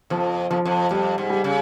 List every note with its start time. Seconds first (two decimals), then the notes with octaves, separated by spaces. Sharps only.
0.10 F2 F3
0.50 F2 F3
0.65 F2
0.91 F2 G3
1.18 G#2
1.30 G3
1.44 C#3